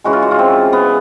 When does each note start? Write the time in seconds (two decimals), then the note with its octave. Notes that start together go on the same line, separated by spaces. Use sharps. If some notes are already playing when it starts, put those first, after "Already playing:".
0.04 C#3 E3 G#3 F#4
0.13 F4
0.22 F#4
0.31 F4
0.39 C4
0.73 B3